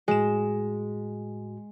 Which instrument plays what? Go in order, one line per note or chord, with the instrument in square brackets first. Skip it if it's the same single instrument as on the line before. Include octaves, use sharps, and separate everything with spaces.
[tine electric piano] A2 F#4 [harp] G#3 E7